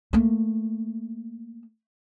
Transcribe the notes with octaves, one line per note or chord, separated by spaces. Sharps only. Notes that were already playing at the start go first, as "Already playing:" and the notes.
A3 A#3